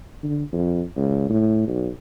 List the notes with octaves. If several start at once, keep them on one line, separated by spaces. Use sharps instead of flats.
D3
F2
C#2
A2
B1